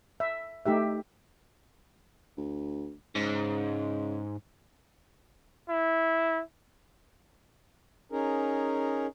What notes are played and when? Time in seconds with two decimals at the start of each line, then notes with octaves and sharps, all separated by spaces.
0.20 E5
0.66 A3 D#4 G4 E5
2.37 D2
3.15 G#2 C#3
5.69 E4
8.12 C#4 D#4 G#4 A#4